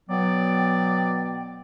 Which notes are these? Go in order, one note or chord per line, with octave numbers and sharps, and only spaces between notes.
B2 F#3 B3 D5 G5